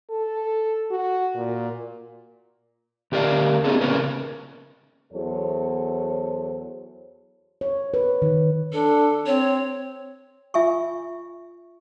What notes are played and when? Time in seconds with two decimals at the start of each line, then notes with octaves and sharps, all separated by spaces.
0.10 A4
0.91 F#4
1.36 A#2
3.12 D2 G4 A#4 D5 F5
3.64 B3 C#4 D#4 G#4 A4
3.81 C#3 A#3 C#4 A#4 B4
5.13 E2 F#3 A4 C5 C#5
7.61 C#5
7.94 B4
8.22 D#3
8.73 D4 A4
9.26 C4 C#5
10.54 F4 E5 G#5 C#6